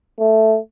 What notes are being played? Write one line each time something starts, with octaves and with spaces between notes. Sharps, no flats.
A3